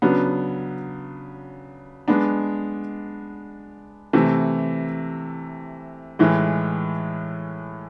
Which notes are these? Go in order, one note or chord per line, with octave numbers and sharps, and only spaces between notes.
C#3 F#3 B3 D4
G#3 B3 D4
C3 E3 A3
A2 E3 G#3